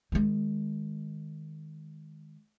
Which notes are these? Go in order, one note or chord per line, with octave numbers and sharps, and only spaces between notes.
D#3 G#3